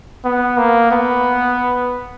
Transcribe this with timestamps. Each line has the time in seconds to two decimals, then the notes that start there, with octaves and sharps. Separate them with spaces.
0.25 B3
0.58 A#3
0.91 B3